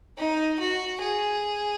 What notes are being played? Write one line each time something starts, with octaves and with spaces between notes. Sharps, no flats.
D#4
F#4
G#4